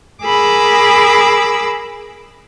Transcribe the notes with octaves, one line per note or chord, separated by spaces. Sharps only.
G#4 A#4 B5 D6 E6